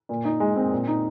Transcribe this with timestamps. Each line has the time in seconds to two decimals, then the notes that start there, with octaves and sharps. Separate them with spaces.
0.09 A#2
0.25 D#4
0.40 G#3
0.56 C4
0.72 A#2
0.88 D#4